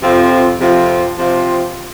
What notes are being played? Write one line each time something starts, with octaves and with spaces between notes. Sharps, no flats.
F2 C3 F3 C4 F4
F2 C3 F3 C4 F4
C3 F3 C4 F4